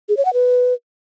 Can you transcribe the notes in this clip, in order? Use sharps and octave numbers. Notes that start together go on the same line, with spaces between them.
G#4
C#5
F#5
B4